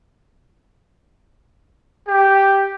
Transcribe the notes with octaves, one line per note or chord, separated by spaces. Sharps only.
G4